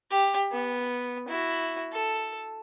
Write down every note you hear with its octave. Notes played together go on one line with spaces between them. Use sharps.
G4
B3
E4 F#4
A4